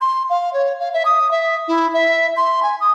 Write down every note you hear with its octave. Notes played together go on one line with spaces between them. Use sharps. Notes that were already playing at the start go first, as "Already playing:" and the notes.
C6
F5
C#5
F5
E5
D#6
E5
E4
E5
C6
G#5
D#6